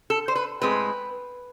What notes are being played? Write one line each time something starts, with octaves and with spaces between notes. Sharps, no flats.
A4
C5
B4
A2 G#3 C4 B4